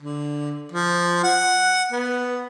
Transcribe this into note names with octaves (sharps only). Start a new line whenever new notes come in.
D3
F3
F#5
B3